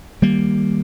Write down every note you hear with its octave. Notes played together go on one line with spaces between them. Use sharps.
D#3 G3 A#3